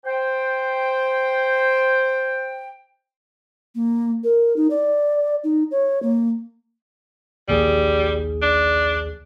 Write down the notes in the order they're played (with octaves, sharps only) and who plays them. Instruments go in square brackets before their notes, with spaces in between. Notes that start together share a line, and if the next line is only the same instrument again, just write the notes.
[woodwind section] C5 G5
[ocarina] A#3
A#4
D#4
D5
D#4
C#5
A#3
[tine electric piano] A#1 D#2 G#4 [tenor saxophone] G3
[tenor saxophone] D4